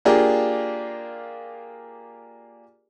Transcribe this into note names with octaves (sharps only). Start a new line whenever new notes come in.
A#3 D4 F4 G4 G#4 A#4